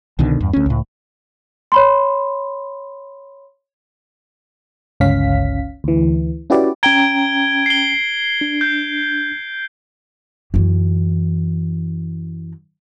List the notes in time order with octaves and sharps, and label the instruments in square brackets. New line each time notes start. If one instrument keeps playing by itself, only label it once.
[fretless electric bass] C2 B2 D3 D#3
E2 G2
D2 C#4
C#2 A2
[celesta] C#5 B5 C6
[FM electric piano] G1 C#2 C#4 F5 B6
D2 E3
C#4 E4 F#4 G4 B4 D5
[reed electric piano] C#4 G5 A#5 [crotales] G#6 D7 G7
[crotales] C7 G7
[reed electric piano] D4
[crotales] G6
[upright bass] F#2 E3